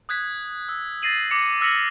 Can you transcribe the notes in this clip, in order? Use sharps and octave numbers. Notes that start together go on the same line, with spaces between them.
D#6 F#6 G#6 B6
E6
A6 A#6 C7 D#7 F#7
D6 A#6 C#7
E6 F6 A#6 B6 C#7 F#7